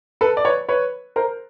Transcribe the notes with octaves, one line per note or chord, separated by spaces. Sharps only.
A4 B4
D5
B4 C#5
B4 C#5
A#4 C5